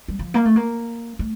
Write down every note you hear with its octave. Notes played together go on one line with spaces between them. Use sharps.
G3
F3
A#3
A3
A#3
A3